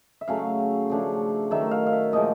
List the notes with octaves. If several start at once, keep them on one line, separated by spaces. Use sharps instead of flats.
E5
C#3 F#3 A3 C#4 F5
C#3 F3 A3 D4
D#3 F#3 A3 E5
F5
F5
E5
A#2 F3 G#3 D#5